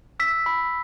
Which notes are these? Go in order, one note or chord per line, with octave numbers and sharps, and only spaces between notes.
E6 B6
B5